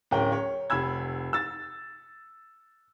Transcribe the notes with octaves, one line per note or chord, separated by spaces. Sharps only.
D1 C#4 A#4 G5
C#5
F1 B5 E6 G#6
E6 A6